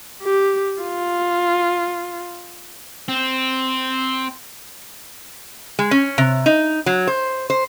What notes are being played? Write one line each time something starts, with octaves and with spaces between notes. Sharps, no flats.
G4
F4
C4
G#3
C#4
C3
D#4
F#3
C5
C5